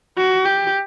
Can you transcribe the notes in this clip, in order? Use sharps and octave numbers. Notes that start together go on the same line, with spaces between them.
F#4
G4